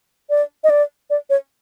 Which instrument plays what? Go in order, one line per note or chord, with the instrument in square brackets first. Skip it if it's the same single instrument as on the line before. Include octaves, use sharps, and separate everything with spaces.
[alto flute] D5
D#5
D5
D5
C#5